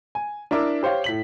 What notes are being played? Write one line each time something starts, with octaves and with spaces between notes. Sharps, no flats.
G#5
D4 E4 A#4 E5 D6
G4 C5 C#5 F5
A2 B6 F#7